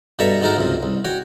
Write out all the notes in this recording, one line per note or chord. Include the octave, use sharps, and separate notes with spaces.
G2 B2 A4 E5 A#5 C#6
G#2 A3 D#4 F#4 A#4 A5
C#2 F#2 C3
C2
F#4 C#5 G5